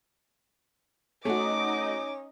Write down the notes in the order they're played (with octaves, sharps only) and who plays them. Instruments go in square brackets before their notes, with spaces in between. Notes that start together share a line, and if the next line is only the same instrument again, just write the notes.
[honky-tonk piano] A3 F#4 [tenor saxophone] C#4 [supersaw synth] D#4 D#5 [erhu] D6